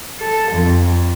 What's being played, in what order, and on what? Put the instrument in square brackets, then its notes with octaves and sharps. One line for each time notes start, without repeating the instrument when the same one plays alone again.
[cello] A4
F2